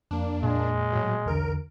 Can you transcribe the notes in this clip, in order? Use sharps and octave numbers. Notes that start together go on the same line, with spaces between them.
F2 A#3 D4
A#2 G#3
A2 F#3
B1 E2 D3 A#4 D7